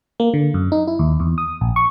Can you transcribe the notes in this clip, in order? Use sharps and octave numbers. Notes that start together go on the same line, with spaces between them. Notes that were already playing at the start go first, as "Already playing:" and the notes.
A#3
D3
F#2
D#4
E4
D#2
E2
D#6
A#1
C#6